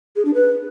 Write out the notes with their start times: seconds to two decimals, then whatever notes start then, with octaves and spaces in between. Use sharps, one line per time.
0.16 G#4
0.25 D4
0.34 B4